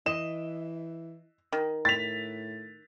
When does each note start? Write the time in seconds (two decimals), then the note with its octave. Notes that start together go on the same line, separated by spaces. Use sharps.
0.06 E3 D#5 E7
1.52 D#3
1.85 A2 A6 B6 F7